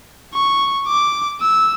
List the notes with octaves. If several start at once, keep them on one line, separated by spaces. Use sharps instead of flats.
C#6
D6
E6